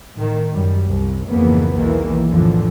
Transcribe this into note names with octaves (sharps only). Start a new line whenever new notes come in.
A2 D#3
F#2 G3
C2
F2 G#2 C#3 E3 A#3 B3
B1 E2 D#3 E3 A#3
F2 A2 D3 E3 F3